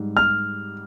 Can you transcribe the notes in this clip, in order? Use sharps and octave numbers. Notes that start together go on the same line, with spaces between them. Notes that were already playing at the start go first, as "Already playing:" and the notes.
Already playing: G#2 G3
F6